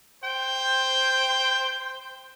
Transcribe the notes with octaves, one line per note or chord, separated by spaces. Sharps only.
C5 G5